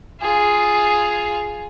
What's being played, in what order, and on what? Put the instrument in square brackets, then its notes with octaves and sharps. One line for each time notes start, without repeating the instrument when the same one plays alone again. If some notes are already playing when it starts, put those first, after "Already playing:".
[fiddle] F4 G#4